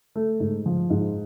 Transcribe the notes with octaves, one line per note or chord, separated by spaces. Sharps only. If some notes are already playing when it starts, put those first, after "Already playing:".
A3
G#2
F3
G#2